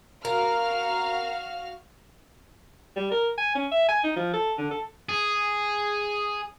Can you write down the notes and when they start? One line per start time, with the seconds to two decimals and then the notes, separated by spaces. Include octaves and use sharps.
0.25 F#4 A#4 F5 F6
2.96 G3
3.11 A#4
3.38 G#5
3.55 C#4
3.72 E5
3.89 G#5
4.04 D#4
4.16 F3
4.34 A4
4.58 D3
4.71 A4
5.09 G#4